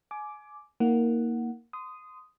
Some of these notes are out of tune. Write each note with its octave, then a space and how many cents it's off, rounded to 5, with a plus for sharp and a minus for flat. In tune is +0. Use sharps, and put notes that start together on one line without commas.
G#5 +25 D6 +0
A#3 +0 D#4 +35 F#5 +0
C6 -25 D#6 +0